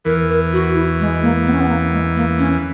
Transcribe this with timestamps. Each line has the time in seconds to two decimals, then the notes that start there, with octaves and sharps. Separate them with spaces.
0.05 E2 E3 A#4
0.29 A#4
0.53 F#4
0.75 E4
1.00 G#3
1.22 A#3
1.46 B3
1.53 C#4
1.60 B3
1.69 A#3
1.92 G#3
2.16 A#3
2.39 C#4